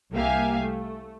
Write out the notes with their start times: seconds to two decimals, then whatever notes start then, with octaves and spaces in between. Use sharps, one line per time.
0.14 C2 A#3 G4 E5 F5 G#5
0.62 A3